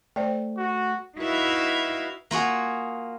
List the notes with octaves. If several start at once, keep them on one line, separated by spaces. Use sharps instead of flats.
A3 C5 D5 G5
F#4
D#4 E4 F#4 B4 E5 F5
A#3 F4 F#4 G#4